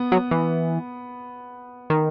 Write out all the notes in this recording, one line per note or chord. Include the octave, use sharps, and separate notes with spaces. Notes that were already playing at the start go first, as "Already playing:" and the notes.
Already playing: B3
F#3
E3
D#3